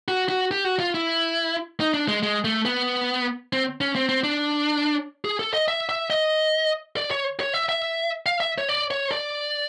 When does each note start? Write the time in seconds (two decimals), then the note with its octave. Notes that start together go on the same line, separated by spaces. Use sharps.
0.08 F#4
0.29 F#4
0.51 G4
0.64 F#4
0.79 F4
0.94 E4
1.80 D#4
1.94 D4
2.08 G#3
2.23 G#3
2.44 A3
2.65 B3
3.53 C4
3.81 C#4
3.95 C4
4.09 C4
4.23 D4
5.25 G#4
5.39 A4
5.54 D#5
5.68 E5
5.89 E5
6.10 D#5
6.97 D5
7.11 C#5
7.40 C#5
7.54 E5
7.69 E5
8.26 F5
8.40 E5
8.58 C#5
8.69 D5
8.91 C#5
9.12 D5